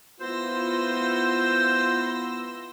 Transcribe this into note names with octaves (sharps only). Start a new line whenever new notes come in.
B3 E4 F4 C5 C6 E6 A#6